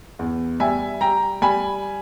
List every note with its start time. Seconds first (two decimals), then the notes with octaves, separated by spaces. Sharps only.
0.19 E2
0.60 G3 E5 G#5
1.01 G3 G5 A#5
1.42 G3 G#5 B5